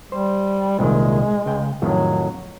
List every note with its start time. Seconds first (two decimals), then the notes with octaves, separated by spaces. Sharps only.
0.12 G3 C5
0.79 C2 A#2 D#3 G#3
1.46 C#2 G5
1.82 F2 A2 D#3 F#3